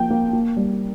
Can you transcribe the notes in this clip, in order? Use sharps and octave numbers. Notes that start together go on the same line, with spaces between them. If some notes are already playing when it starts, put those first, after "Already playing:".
Already playing: F3 A#3 G5
A#3
A#3
G3